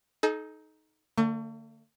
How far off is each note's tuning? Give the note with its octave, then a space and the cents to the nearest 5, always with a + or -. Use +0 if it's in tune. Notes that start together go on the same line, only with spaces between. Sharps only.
D#4 +5 A4 -40
D3 +0 A3 +45